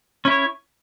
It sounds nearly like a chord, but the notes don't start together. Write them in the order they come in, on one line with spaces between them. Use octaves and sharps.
C#4 E4 C#5